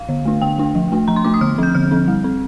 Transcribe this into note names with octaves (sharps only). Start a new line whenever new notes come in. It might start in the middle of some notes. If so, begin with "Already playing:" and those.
Already playing: F5
D3
A3 D4
D3 G5
A3 D4
F3
A3 D4
F3 A#5
C6
A3 D4 D6
D#6
D3 F6
F3 C4 G6
D3 F6
F3 C4
G3
C4